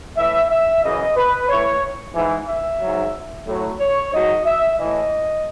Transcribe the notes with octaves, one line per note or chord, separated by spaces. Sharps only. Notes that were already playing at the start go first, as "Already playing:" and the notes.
A2 E3 E5
E5
F#2 C#3 E3 D#5
B4
A2 E3 C#5
G#2 E3
E5
G#2 F#3
A2 F#3
C#5
G#2 F#3 D#5
E5
A2 E3 D#5